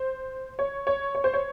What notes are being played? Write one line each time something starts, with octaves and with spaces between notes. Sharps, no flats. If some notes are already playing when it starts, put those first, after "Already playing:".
Already playing: C5
C#5
C#5
C#5
C5
C#5